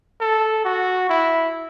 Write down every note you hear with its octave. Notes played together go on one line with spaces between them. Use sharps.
A4
F#4
E4